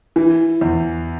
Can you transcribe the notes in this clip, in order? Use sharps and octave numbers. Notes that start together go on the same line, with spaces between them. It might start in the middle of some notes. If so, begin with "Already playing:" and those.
E3
E2